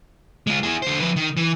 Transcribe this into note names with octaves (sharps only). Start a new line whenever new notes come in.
G#3 F4
E4 G#4
D3 C5
F3 B4
D#3
E3